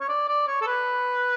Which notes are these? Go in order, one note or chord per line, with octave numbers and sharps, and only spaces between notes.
C#5
D5
D5
C#5
A4
B4